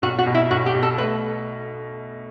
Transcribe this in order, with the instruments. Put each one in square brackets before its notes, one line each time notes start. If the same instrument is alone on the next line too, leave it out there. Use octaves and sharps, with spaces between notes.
[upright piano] B1 [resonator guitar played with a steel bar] F#4
[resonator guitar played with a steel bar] F#4
[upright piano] B2
[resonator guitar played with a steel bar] E4
[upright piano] B1 [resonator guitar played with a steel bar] F#4
[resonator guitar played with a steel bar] G4
[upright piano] B2
[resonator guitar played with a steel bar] A4
[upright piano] A3 [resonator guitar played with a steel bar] B4